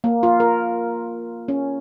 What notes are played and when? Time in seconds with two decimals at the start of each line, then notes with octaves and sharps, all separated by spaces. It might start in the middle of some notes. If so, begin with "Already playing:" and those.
0.04 A#3
0.23 F4
0.40 A#4
1.48 C#4